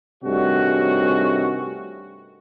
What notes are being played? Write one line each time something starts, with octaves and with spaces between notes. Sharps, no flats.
G2 C3 D#3 A3 C#4 F#4